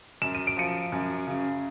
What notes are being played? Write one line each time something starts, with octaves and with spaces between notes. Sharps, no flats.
F#2 E7
D#7
D7
F3 C#7 D#7
F#2
C#3